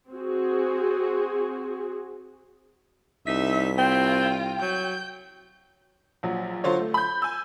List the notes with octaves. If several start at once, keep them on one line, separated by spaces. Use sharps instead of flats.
C4 F#4 G#4
C2 D#4 E5 B6
C4 F4 G5
F#3 G6
A#1 F#3
D3 F#3 F4 C5 C#5
A3
B5 G6
G#5 E6